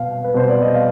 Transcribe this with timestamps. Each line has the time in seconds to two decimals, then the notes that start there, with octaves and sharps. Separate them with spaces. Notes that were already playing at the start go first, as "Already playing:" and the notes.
Already playing: B2 F5
0.24 B4
0.34 B2 C5
0.49 D5
0.62 D#5
0.75 F5